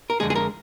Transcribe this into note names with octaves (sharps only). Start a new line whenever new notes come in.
A#4
F2 D3 G#3 G#4
G#4
A#4